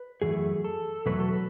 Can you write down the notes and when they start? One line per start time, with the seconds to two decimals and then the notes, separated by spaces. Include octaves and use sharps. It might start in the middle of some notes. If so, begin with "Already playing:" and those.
Already playing: B4
0.22 F#2 E3 A3 G#4
0.64 A4
1.06 E2 B2 F#3 A3 B4
1.20 A4
1.33 B4